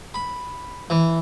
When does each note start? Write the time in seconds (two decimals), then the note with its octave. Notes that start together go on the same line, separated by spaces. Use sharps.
0.14 B5
0.90 E3